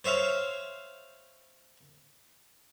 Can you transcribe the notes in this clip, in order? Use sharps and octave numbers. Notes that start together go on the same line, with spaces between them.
C5 C#5 E5 F5